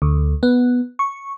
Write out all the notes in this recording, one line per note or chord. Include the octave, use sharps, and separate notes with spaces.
D2
B3
C#6